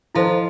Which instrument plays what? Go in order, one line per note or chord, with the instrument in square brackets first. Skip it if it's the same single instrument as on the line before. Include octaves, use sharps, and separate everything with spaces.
[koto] F3 [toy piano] E4 A4 C5 D#5